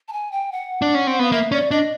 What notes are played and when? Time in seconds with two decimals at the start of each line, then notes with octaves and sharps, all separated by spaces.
0.08 A5
0.13 G#5
0.32 G5
0.52 F#5
0.82 D4
0.95 C#4
1.07 C4
1.19 B3 F5
1.32 A#3 E5
1.51 C#4 D5
1.71 D4 D#5